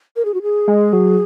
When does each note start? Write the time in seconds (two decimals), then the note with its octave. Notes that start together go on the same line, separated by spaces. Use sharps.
0.16 A#4
0.25 G#4
0.34 F#4
0.42 G#4
0.68 G#3
0.93 F#3